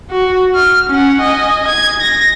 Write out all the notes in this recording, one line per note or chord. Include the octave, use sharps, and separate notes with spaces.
F#4
F6
C#4 F#5
D#5 G#5
G#6
A#6